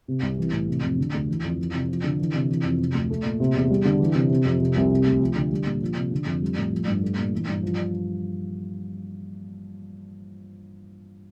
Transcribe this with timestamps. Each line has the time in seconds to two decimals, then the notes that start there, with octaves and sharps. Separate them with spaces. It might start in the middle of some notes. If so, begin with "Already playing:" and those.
0.08 C3
0.23 C2
0.38 E3
0.52 A2
0.69 C3
0.83 F2
0.98 D3
1.14 D2
1.29 E3
1.44 F2
1.59 E3
1.74 C3
1.88 F3
2.04 D3
2.18 E3
2.34 C3
2.49 E3
2.64 F2
2.79 C3
2.95 D2
3.10 A3
3.24 A#2
3.40 C3
3.55 E2
3.71 G3
3.85 D3
4.00 E3
4.15 C3
4.30 C3
4.45 F2
4.60 C3
4.76 C2
4.91 C3
5.07 D2
5.21 F3
5.36 D3
5.52 G3
5.66 A#2
5.82 F3
5.97 C3
6.12 D3
6.26 F2
6.42 G3
6.57 A2
6.72 F3
6.88 G2
7.03 A3
7.18 A#2
7.32 E3
7.48 G2
7.63 F3